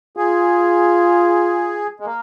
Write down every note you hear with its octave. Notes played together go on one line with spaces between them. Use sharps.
F4 G#4
G#3
A#3